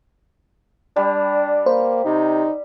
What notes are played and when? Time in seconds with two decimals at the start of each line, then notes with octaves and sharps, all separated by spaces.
0.96 G3 D4
1.66 A#3 C5
2.05 C3 D#4